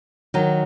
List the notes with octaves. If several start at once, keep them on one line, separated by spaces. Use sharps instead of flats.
D#3 F#3